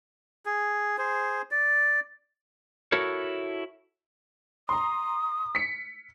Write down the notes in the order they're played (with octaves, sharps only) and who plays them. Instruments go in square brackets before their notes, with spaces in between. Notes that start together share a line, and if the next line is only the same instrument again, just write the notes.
[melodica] G#4
G#4 C5
D5
[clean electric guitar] E4 F#4 A4 A#4 C#5
[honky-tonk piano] A#5 C6 [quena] D#6
[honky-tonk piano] B6 C#7